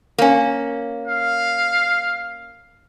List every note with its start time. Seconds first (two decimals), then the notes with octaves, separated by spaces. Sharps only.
0.18 A#3 C#4
1.07 F5